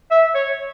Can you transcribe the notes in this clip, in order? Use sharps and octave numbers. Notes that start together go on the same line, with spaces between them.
E5
C#5